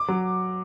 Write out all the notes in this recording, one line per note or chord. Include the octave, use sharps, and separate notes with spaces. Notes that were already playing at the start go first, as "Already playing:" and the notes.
Already playing: D6
F#3